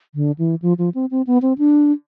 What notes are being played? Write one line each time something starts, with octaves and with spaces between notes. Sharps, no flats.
D3
E3
F3
F3
C4
C4
B3
C4
D4